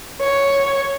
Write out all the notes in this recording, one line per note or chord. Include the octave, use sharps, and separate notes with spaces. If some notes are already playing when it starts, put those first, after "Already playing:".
C#5